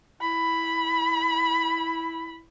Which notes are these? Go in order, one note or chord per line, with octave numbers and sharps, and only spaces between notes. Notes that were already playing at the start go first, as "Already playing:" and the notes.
E4 B5